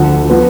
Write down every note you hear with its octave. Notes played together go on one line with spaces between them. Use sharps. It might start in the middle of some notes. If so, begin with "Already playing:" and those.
Already playing: D2 D3 F3 F#5
F3 B3